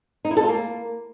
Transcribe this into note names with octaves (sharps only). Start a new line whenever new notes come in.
D#4
E4
A4
F4
A#3